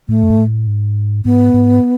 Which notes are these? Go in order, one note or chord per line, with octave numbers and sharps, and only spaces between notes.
A2 A3
F#2
G#2
A2
G#2
G#2 B3
G#2